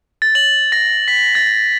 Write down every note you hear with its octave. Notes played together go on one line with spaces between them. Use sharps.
A6
F#7
A#6
B6
A6